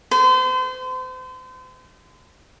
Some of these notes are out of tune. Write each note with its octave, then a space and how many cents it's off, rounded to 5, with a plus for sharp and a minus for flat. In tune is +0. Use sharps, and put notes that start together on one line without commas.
C5 -35